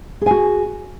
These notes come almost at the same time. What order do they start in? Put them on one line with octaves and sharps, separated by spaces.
G#4 G#5 F#4